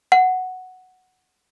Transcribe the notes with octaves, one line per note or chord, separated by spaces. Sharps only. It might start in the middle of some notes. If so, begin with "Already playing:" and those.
F#5